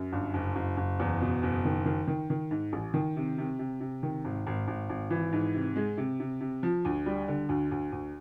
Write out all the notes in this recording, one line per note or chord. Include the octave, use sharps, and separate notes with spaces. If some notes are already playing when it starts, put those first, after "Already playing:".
Already playing: F#2
G1
F#1
F#1
F#1
E2
B2
F#1
D#3
D#3
D#3
D#3
G#2
A1
D#3
C3
C3
C3
C3
D#3
G#1
G#1
G#1
G#1
E3
G#2
C3
G#3
C3
C3
C3
F3
D2
G3
D3
D2
D2
D2